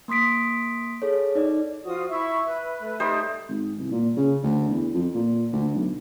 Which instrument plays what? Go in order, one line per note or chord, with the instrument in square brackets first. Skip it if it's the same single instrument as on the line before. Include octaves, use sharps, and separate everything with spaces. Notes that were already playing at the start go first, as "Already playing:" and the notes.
[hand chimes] A#3 C6 D#6 B6 D7
G#4 A4 C#5
D#4 D5
[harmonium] F3 F#4 [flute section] F4 D#6
[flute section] E4 C#6 [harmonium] E5
[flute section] B4
[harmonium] A3
[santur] G3 D#4 C5
[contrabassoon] G#1
C2
A#2
C#3
D2
E2
F2
A#2
D2
B1